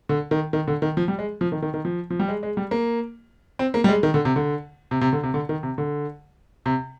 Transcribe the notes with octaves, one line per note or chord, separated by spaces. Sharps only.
D3
D#3
D#3
D3
D#3
F3
G3
G#3
F3
D#3
D#3
D#3
F3
F3
G3
G#3
G#3
G3
A#3
C4
A#3
G3
G#3
D#3
D3
C3
D3
C3
C3
D3
C3
D3
D#3
C3
D3
C3